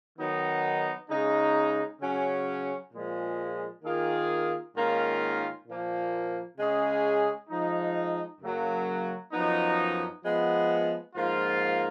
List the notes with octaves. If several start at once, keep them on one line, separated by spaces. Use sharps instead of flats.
D#3 F#3 B3 D#4
C#3 G#3 D#4
C#3 F#3 C#4
A#2 F3 G#3
D#3 A#3 F4 G#4
G#2 D#3 A#3 C#4 F4
A#2 F3 A#3
C#3 G#3 C#4 G#4
F3 G#3 D#4
F#2 C#3 F#3 A#3
F#2 F3 B3 D#4
F3 G#3 B3
G#2 F3 A#3 F4